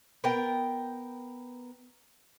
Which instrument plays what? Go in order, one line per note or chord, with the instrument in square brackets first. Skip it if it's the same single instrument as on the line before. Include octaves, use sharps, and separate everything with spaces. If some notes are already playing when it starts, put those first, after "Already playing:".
[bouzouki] B3 A#4 G5